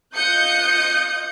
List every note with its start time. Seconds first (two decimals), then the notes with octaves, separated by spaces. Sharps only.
0.14 F4 D#5 D#6 F#6 G6 C#7